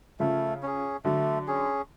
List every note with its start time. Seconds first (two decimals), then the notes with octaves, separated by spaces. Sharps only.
0.20 C#3 F3 A3
0.63 C#4 G#4
1.05 D3 F#3 A3
1.48 C#4 G#4